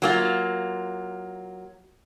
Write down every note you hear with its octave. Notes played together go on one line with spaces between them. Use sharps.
F#3 A#3 F4